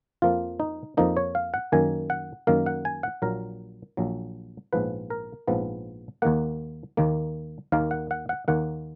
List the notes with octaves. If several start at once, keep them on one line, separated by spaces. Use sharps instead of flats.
F2 F3 A#3 F4
D#4
F2 F3 A#3 D#4
C#5
F5
F#5
F#2 D#3 A#3 G#5
F#5
F#2 D#3 A#3 F5
F#5
G#5
F#5
A#1 A#2 F#3 A#4
A#1 A#2 F#3
A#1 G#2 F3 B3 B4
A#4
A#1 G#2 F3 B3
D#2 D#3 A#3 F#5
D#2 D#3 A#3
D#2 D#3 A#3 F5
F#5
F#5
F#5
D#2 D#3 A#3 F#5